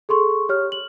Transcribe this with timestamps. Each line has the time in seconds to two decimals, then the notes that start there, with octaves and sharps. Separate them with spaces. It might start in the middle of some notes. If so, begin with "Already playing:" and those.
0.09 G#4 A4 C6 C#6
0.49 G4 C#5 F6
0.72 F#7